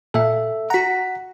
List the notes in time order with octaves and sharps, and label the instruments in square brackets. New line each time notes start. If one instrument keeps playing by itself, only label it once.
[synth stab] A#2 [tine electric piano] A4 E5
[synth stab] F#4 A#5 [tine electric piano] F#5 B6